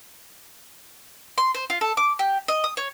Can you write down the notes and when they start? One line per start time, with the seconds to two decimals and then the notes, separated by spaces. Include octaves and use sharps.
1.38 C6
1.55 C5
1.70 F4
1.81 A4
1.97 D6
2.19 G4
2.48 D#5
2.64 D#6
2.77 C#5